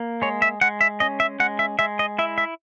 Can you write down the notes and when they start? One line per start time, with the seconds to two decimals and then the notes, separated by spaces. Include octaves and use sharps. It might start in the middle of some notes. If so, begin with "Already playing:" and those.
Already playing: A#3
0.22 G#3 C#5
0.42 E5
0.61 G#3 F#5
0.81 E5
1.00 C#4 D#5
1.20 E5
1.40 G#3 F#5
1.59 E5
1.79 G#3 E5
1.99 D#5
2.18 E4 E5
2.38 E5